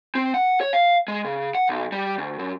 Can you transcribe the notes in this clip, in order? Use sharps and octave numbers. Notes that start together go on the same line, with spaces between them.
C4
F#5
C#5
F5
G#3
C#3
F#5
B1
G3
D2
F#2